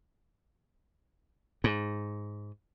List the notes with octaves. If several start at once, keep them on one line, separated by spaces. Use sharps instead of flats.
G#2